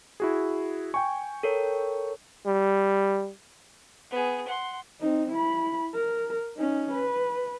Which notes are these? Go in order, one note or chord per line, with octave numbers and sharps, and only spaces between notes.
E4 F#4 G#4
G5 G#5 C#6
A4 A#4 C#5
G3
B3 G#4
F#5 C6
C4 D#4
E4 B5
A#4
C#4 D#4
B4